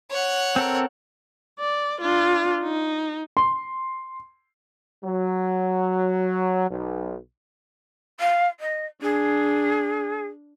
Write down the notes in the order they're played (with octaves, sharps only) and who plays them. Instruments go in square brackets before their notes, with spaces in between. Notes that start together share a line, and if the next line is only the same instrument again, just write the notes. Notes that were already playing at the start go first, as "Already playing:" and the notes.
[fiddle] C#5 F#5
[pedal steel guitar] C4 A4 A#4
[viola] D5
D4 F4
D#4
[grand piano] C6
[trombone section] F#3
B1
[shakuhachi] F5
D#5
[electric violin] D4 [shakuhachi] G#4